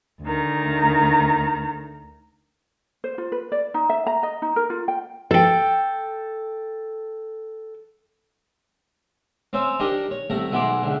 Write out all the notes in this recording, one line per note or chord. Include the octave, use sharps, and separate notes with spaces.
D2 D#3 A#5
C5
F4
B4
D5
D#4
E5
A#5
D#5
D#4
A#4
F4
G5
A4 G5
C4 C#4 C5 C#5 E5
D4 D#4 G4 A#4 D#5
C#5
C2 A2 A3 A#5
B1 G#3 B3 E4 C6 D6
C#2 D3